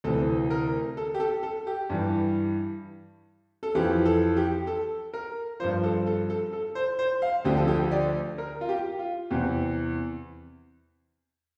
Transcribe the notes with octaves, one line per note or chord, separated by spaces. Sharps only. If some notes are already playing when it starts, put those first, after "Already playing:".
D2 C3 E3 A4
A#4
A4
G4
A4
A4
G4
G2 E3
A4
F2 E3 G4
A4
G4
A4
A#4
G2 F3 C5
A4
A4
A4
A4
C5
C5
F5
D2 D3 F3 G4
A4
G4
D5
A#4
F4
G4
F4
E2 C3 E3 G4